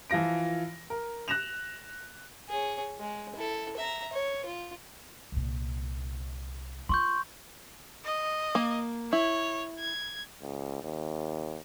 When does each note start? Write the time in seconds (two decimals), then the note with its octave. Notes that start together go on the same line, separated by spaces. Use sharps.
0.10 E3 F3 F4 A#6 D7
0.90 A#4
1.28 F#6 A#6 E7 F7
2.49 G#4 C#5
2.99 G#3
3.35 E4 A4
3.77 E5 A#5
4.13 C#5
4.45 F4
5.32 C2 A#2
6.89 F4 C6 C#6 G6
8.05 D#5
8.55 A#3
9.13 E4 C#5
9.79 G#6
10.42 C#2
10.83 D#2